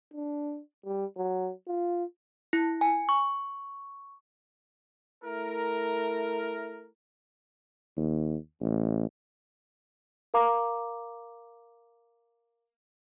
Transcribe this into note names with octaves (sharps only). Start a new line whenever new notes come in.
D4
G3
F#3
F4
E4
G#5
C#6
A3 E4 A#4
D#2
A1
A#4 F5 A#5 D6